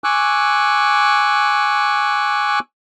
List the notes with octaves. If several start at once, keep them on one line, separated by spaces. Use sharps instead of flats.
G#5 C#6 D6 E6 F#6